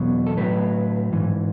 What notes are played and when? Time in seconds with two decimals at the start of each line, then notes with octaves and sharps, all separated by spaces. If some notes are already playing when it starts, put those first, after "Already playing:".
Already playing: E2 B2 F#3
0.27 A4
0.37 A2 F#3 B4
1.12 G#2 E3